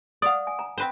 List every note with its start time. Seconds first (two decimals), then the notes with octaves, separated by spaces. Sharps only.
0.22 D5 F5 F#5 D#6
0.47 G#5
0.59 A#5
0.78 C4 B4 C5